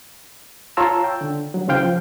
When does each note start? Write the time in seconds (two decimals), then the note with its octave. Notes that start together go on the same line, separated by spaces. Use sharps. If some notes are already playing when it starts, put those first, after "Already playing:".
0.77 F4 C#5 A5 A#5 C6 E6
1.04 G5
1.21 D3
1.54 F#3
1.68 C#3 E3 C5 F5 G5
1.83 F3